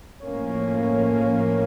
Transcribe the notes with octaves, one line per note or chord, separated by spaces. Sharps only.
A2 F3 A#3 C#4